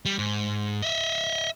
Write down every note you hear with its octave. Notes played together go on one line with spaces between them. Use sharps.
G3
G#2
D#5 E5